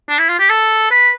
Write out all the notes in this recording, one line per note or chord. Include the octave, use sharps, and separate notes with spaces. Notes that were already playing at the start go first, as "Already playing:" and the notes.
D4
E4
F4
G4
A4
B4